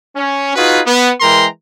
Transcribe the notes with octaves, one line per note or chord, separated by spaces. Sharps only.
C#4
D#4 F4 F#4 G#4 B4
B3
E3 G#3 A#4 G5 A#5 C6